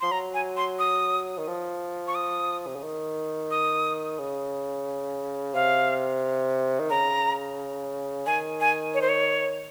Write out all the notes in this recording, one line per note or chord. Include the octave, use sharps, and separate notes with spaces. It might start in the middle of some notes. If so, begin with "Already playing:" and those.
F3 C6
F#3 A#5
G#5
C6
D#6
D#3
F3
C#6
D#6
C3
C#3
D#3
D#6
C#3
C3 F5
D#3
C#3 A#5
D#3 G#5
G#5
C#5
C5
C#5